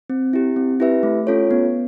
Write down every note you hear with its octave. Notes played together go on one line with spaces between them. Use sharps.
C4
E4 G4
C4
E4 G4 B4 E5
A3
C#4 F4 A4 C#5
B3